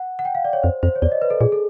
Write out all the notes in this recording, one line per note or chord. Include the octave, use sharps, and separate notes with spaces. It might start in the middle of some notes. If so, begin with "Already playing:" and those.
Already playing: F#5
F#5
G5
F5
D5
C#5
F2 C5
F2 C5
C#5
E2 D5
D#5
B4
A4
A#2 G#4
A4